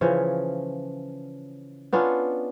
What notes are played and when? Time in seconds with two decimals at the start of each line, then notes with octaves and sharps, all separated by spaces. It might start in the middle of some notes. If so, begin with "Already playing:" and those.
0.01 C#3 E3 F3 C#5
1.93 B3 C#4 D4 F4